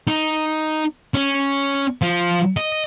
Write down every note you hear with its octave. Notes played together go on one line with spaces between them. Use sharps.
D#4
C#4
F3
D#5